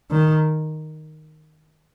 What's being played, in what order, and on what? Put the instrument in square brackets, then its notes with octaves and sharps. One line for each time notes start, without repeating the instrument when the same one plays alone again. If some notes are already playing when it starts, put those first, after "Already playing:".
[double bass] D#3